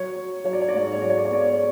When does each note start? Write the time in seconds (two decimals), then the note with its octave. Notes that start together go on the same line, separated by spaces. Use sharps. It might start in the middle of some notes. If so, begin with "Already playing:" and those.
Already playing: F#3 C#5
0.16 F#3
0.44 F#3 C#5
0.53 D5
0.61 C#5
0.68 D5
0.74 G#2 C#5
0.85 D5
0.93 C#5
1.02 F#3 D5
1.09 C#5
1.17 D5
1.25 C#5
1.30 B3 D5
1.41 C#5